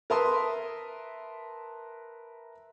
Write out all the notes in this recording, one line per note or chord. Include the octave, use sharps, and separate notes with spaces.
A#4 B4 E5 A5 C6 D#6